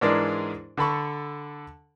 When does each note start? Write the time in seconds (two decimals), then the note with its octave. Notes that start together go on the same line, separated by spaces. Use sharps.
0.01 G#2 E3 G#3 D4 A#4 D5
0.77 D3 A4 B5 C#6